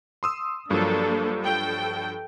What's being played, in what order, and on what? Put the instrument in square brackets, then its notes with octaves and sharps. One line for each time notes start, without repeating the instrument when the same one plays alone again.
[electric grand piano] C6 D#6 E6
[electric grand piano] G2 F3 F#3 [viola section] A#3 D4 A4
[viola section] A4 G5